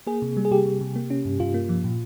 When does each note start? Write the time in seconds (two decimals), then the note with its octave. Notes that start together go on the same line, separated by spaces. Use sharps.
0.07 A#3 G#4
0.22 C3
0.37 G3
0.45 G#4
0.51 C3 G4
0.66 C3
0.81 C3
0.96 A#3
1.10 C#4
1.25 G2
1.40 G2 F4
1.54 A#3
1.69 F3
1.84 A#2